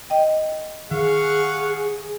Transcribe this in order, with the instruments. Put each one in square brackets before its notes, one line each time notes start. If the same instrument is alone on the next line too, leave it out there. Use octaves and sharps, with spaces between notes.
[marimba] D#5 G5
[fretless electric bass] D#3 [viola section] G#4 [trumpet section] F5 F#5 C#6